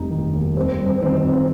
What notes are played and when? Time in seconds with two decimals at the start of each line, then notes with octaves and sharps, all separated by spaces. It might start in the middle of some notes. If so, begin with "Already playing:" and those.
Already playing: F1 F2 G3 D#4
0.10 D#3
0.33 D#2
0.57 G3 C4
0.79 G1
0.86 C4
1.01 D#3 C4
1.17 C4
1.24 F2
1.33 C4